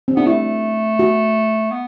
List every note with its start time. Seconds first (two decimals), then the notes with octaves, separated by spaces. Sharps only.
0.08 C4
0.16 B3 D4
0.26 A3 E4
0.99 F#4
1.71 B3